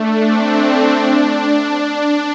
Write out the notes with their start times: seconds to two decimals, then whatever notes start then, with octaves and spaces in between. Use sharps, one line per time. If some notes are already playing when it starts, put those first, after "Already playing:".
Already playing: A3 D4
0.25 C4
0.93 D4